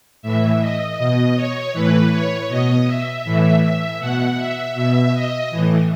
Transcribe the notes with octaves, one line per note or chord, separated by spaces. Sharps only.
A2 E3 E5
D#5
B2 D#5
C#5
A2 E3 B4
C#5
B2 D#5
E5
A2 E3
E5
B2 F#5
E5
B2 E5
D#5
A2 E3